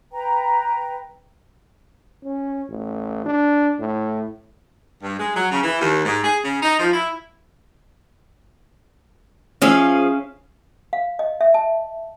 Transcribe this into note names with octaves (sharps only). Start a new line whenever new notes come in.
B4 G5 A#5
C#4
A1
D4
A2
G2
G#3
F#3
C#3
E3
D#2
G#2
G#4
C#3
D#4
F3
E4
F3 C#4 G#4 E5 F5
F5
D#5
E5
A5